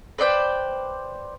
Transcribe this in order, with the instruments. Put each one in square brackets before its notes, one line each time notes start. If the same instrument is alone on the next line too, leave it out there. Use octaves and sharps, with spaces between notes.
[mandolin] B4 C5 D5 G5